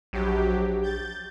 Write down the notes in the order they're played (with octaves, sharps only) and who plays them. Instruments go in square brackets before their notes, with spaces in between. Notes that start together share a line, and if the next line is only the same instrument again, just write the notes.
[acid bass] A#1 [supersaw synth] F#3 G4
[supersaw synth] G6 A6